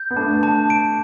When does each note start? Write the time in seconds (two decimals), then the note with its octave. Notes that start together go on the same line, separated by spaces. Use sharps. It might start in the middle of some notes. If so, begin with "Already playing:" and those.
Already playing: G6
0.11 B3
0.16 A3 D4 A5
0.43 A5
0.70 D7